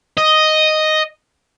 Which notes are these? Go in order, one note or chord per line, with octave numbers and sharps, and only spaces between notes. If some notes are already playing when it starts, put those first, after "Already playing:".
D#5